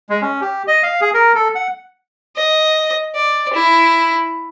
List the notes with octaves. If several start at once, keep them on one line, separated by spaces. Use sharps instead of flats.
G#3
C#4
G4
D#5
F5
G#4
A#4
A4
F#5
D#5
D5
E4